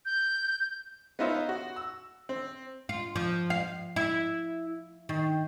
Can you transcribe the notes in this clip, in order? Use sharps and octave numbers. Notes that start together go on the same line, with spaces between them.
G6
B3 C#4 D#4 F4 C5 E5
F#4
E6
C4
F4
F3
F5
E4
D#3